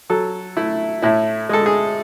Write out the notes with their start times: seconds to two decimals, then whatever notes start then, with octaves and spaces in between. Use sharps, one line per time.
0.09 F#3 A4
0.57 A3 E4
1.02 A2 E4
1.49 G#3 A4
1.66 G#4